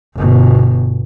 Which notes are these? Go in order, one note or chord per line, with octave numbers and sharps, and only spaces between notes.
G1 B2